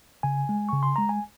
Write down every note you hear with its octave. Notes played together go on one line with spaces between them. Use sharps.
C#3 G#5
G#3
C#3 C#6
C6
G#3 A#5
G#5